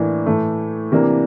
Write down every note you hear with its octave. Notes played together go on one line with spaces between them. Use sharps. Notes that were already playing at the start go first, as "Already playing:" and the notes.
Already playing: A2 E3 A#3 D4
A2 E3 A3
C3 E3 A#3 D4